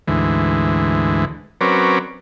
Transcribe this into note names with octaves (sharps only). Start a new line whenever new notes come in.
D2 G#2 E3
F#3 C4 C#4 A#4 B4 D5